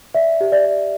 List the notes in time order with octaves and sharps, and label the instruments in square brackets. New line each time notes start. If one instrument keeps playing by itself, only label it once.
[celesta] D5 E5
G4
D5
D5